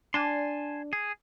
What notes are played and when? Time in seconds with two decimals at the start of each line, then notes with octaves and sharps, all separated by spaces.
0.14 D4 G#5 A5 C6
0.93 G#4